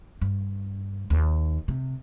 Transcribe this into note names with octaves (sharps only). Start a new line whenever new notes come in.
G2
D#2 D#3
C3